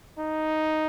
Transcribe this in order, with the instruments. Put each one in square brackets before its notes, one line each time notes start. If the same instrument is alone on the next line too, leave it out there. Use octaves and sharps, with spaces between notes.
[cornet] D#4